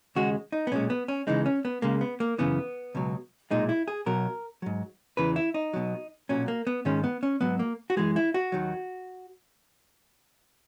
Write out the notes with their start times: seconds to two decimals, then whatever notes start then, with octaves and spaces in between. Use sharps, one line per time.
0.15 D#2 C#3 G#3 F#4
0.52 D#4
0.67 B3
0.72 B1 A#2 G#3 C#4
0.90 B3
1.08 C#4
1.27 C#2 C#3 E3 G#3 D#4
1.46 C#4
1.65 B3
1.82 C#2 C#3 G#3 A#3
2.01 B3
2.20 A#3
2.38 F#2 C#3 E3 B3
2.95 C#2 B2 F#3
3.51 B1 A#2 G#3 D#4
3.69 E4
3.88 G#4
4.06 B1 B2 F#3 A#4
4.62 G#2 F#3
5.17 E2 C#3 E3 B4
5.36 E4
5.54 D#4
5.73 B1 B2 F#3
6.29 B1 A#2 F#3 C#4
6.48 A#3
6.67 B3
6.85 G#2 D#3 G#3 C#4
7.04 B3
7.23 C#4
7.41 G#2 F#3 B3
7.59 A#3
7.90 F#4
7.97 F#2 E3 G#3 G#4
8.16 E4
8.34 F#4
8.52 D#2 D#3 F#3